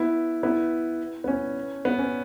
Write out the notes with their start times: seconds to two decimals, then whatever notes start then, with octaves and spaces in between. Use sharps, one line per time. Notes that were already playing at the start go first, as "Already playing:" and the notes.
Already playing: B3 E4
0.43 B3 E4
1.24 B3
1.28 C#4
1.85 B3
1.99 C#4